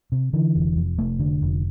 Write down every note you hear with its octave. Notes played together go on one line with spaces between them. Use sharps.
C3
D3 E3
F1
F2
F1 A3
D3
F1